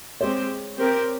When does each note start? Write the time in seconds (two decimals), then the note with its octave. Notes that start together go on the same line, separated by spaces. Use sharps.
0.21 G#3 C4 G4 C5 C#5
0.78 C4 G4 A#4